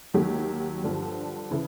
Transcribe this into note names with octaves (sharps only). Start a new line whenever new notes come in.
D#2 D#3 F#3 G4
G2 D3 F3
C#3 E3